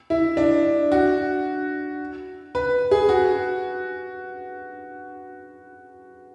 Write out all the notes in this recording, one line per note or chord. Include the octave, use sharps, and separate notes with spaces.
E4
D4
F#4
B4
G#4
F#4